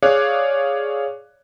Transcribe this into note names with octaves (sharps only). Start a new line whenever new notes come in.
G#4 C#5 D5 F5 D6 F#6